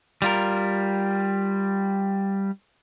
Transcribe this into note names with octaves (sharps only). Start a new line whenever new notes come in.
G3 F4 A#4